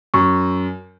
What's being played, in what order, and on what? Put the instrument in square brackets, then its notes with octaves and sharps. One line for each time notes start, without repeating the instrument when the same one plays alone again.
[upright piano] F#2 [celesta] C#6